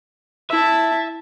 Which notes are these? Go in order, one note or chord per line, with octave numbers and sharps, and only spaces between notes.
E4 E5 A5